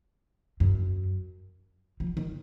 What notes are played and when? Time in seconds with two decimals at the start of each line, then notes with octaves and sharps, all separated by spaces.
0.60 F#2
2.00 F3
2.17 D#3